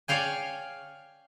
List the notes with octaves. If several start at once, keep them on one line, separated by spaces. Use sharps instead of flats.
C#5 D5 F5 G5 G#5